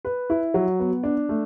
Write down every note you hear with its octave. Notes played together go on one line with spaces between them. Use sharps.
B4
E4
F#3
B3
D4
A3